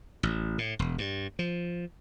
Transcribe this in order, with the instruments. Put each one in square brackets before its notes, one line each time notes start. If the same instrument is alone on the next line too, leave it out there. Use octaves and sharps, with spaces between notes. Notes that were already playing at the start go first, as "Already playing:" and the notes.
[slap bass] A1
A2
E1
G2
F3